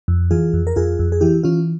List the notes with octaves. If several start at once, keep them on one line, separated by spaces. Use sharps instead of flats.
F2
E3 F4 G#4
F2
A#4
F2 F4 G#4
F2
G#4
E3 E4 G4
E3 C#4 F4